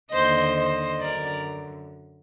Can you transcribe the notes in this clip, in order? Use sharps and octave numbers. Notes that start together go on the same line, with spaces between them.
D#2 D3 C5 D#5
C5 D#5
F#2 D3 A#4 D5